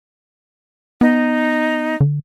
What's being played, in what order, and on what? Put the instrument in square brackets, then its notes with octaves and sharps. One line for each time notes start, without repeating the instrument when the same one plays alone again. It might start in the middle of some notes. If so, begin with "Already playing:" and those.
[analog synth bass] B3 [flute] D#4
[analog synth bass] D3